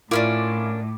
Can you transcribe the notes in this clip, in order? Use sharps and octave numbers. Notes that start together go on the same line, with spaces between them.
A2 A#3 C#4 D4 E4 F4 D6